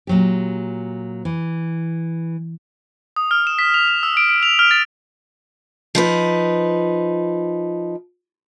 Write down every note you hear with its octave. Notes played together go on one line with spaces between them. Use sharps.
A#2 F#3 G4
E3
D#6
F6
E7
B6
F7
E7
E6
D7
D7
F7
F6
A6
F3 D#4 B4